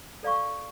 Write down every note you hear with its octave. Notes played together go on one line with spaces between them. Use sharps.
A4 D5 F5 C#6